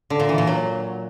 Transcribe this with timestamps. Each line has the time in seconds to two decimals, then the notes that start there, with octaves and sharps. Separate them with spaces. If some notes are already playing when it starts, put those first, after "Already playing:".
0.10 D3
0.20 A#2
0.29 E3
0.38 A#2
0.47 F#3